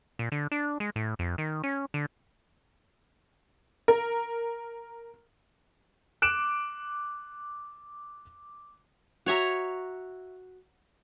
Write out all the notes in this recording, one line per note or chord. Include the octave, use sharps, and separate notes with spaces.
A#2
D3
D4
G#3
A2
F2
D#3
C#4
D3
A#4
D6 F#6 D7 E7
F#4 C#5 E5 A#5